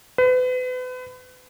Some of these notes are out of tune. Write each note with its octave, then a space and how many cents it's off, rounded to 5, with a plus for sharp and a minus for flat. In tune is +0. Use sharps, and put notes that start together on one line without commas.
B4 +35